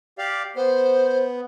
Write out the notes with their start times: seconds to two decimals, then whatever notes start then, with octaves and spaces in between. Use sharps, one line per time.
0.18 G4 D5 F5
0.56 B3 C5